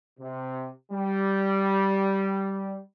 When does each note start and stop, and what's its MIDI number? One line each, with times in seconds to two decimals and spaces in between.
0.20 0.69 48
0.92 2.80 55